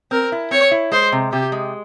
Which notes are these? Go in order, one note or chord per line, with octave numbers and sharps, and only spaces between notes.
C4 A#4
E4
C4 C#5
E4
G#3 C5
C3
C3 G4
G#3